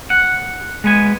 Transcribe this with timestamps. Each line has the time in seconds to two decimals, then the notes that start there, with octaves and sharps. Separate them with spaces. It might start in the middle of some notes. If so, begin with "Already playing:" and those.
0.10 F#5
0.84 G#3 B3 G#5